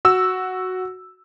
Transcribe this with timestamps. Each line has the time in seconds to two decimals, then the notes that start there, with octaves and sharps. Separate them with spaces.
0.05 F#4 E6